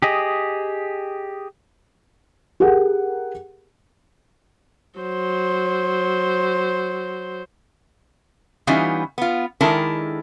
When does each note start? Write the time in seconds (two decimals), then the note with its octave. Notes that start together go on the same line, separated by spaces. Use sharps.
0.02 G4 G#4 D#5
2.60 G4 G#4 A#4 F#5
5.00 F#3 C5
8.67 E3 G3 B3 C#4 D#4 F4
9.18 B3 F4
9.61 D#3 G#3 D4 E4 A4 A#4